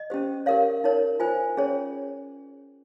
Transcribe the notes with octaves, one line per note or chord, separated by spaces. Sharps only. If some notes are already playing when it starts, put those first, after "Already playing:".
Already playing: D#5
C#4 G4 C5
G4 A#4 C#5 F5
D#4 A#4 C#5
F4 C5 G#5
C#4 G#4 C#5